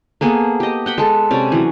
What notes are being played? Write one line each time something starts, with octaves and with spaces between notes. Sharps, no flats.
A#3 B3 G#4 A4
G4 D#5
F#5 G5 B5
G#3 A4
C3 C#4 D5
E3 F#3